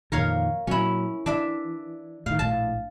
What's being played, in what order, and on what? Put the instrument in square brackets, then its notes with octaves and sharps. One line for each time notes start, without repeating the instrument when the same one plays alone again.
[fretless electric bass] F2 A#2 D#3 [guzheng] A#4 C#5 F5
[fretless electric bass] A#2 F#3 [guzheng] C#4 E4
[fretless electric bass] E3 [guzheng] D4 E5
[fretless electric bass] A2 D#3 [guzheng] F5
[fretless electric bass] A#1 A2 [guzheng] A5